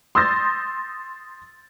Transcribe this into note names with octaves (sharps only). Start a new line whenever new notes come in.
C6 D#6 E6 G6 A6 A#6